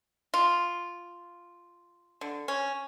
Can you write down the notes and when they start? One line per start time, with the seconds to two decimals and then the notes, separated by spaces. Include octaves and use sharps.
0.34 F4
2.21 D3
2.48 C#4